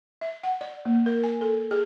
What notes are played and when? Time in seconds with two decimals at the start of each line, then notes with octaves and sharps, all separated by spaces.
0.21 E5
0.43 F#5
0.61 D5
0.85 A#3
1.06 A#4
1.24 G#5
1.41 A4
1.71 G#4